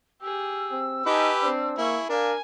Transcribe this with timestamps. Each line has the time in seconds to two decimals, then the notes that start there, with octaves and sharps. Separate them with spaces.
0.21 G4 G#4 E6
0.72 C4
1.06 D#4 G4 B4 G#5 A5
1.42 C4 D4 C5
1.78 A#3 E4 G#4 C#6
2.10 D4 A#4 F5 G#5